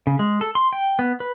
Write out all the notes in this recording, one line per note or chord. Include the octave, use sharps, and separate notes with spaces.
C#3
G#3
A4
C6
G5
B3
B4